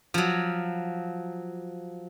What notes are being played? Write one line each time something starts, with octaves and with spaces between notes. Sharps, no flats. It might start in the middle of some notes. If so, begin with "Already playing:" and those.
F3 F#3